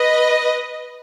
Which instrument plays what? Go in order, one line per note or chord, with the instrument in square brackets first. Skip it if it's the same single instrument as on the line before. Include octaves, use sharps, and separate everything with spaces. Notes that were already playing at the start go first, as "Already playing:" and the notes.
Already playing: [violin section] B4 D#5